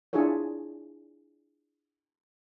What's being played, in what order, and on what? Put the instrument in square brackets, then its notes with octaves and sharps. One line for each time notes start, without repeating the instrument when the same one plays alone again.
[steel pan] D4 E4 F4 G#4 A4 C#5